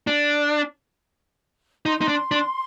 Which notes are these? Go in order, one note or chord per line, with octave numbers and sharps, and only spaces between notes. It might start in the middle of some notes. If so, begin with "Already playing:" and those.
D4
D#4 C6
D#4
D4
D4